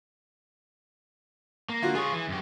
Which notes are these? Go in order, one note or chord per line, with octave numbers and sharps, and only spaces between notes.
A#3
D3 F4 F#4
F4 G#4 C#5
E3
F#2 G4